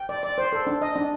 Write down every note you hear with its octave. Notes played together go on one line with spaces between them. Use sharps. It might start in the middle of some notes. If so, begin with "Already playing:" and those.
Already playing: G5
D5
D5
C5
A4
D4
D#5
D4